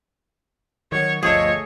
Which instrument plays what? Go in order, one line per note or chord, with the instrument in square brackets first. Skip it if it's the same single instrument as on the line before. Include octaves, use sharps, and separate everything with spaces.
[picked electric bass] D#3 F#3 [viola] C#5
[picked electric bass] G1 D2 F3 [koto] A3 G#4 [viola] C#5 [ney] D#5